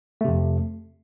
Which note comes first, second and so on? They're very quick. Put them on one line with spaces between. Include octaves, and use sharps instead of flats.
A3 C3 F2